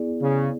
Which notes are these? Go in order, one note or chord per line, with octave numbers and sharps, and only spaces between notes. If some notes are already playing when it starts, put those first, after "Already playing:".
Already playing: B3 E4 G#4 D5
C#3